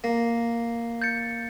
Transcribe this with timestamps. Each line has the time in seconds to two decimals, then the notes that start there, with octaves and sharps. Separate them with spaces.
0.04 A#3
1.02 G6 A6 C#7